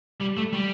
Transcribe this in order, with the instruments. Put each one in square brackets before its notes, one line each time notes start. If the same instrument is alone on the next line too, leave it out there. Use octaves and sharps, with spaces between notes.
[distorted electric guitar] G3
A3
G3